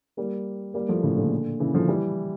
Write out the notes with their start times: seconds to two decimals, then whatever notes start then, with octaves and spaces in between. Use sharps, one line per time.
0.17 G3 A#3
0.74 G3 A#3
0.88 F3 A3
1.03 A2 C#3
1.17 A#2 D3
1.60 C#3 E3
1.74 D3 F3
1.88 E3 G3